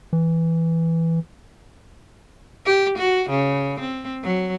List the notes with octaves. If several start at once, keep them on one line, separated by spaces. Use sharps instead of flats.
E3
G4
F#4
C#3
C4
F#3